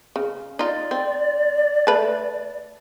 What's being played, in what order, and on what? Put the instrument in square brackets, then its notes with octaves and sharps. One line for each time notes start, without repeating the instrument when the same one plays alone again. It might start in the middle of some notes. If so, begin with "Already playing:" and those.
[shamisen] C#3
[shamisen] D#4 F4 [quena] D5
[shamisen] C4
A3 B4 A5